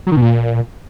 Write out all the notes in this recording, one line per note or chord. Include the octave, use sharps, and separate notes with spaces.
F#3
D#3
B2
A#2